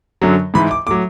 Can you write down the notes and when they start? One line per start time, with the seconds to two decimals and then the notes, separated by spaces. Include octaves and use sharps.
0.22 F#2 D3 F#3
0.54 G#2 E3 B5
0.71 D6
0.87 A2 F#3 D6